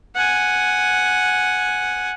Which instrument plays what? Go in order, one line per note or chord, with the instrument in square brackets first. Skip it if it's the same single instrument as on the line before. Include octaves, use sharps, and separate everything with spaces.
[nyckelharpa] F#5 G#5